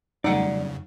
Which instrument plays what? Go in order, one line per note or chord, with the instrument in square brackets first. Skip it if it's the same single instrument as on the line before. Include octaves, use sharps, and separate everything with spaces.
[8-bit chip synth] F2 C#3 [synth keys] F#3 G3 A3 [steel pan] D#4 [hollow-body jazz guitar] D5 F#5